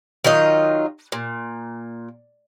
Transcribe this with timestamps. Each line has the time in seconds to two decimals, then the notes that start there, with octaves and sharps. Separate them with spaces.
0.24 D#3 F#3 F4 D#5
1.12 A#2